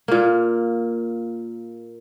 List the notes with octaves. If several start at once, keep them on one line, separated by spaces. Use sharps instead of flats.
A#2 A#3